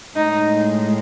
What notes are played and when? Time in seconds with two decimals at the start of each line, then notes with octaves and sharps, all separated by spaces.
0.16 A2 G#3 D#4